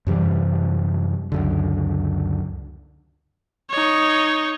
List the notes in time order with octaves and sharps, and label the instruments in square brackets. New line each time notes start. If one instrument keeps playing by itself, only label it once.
[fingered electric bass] F#2 C3 E3 G3
C#2 F#2 D3
[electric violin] D#4 C#5